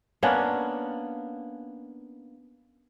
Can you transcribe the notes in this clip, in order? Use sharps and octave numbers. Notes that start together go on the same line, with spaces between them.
A#3 B3 C#4 D4